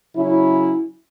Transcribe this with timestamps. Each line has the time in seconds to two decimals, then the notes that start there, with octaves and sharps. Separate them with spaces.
0.15 C#3 F#3 C#4 E4